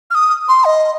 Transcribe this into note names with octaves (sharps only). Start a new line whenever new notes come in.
F6
D#6
C6
D#5